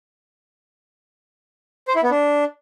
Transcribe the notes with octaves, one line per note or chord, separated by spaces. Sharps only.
C5
E4
B3
D4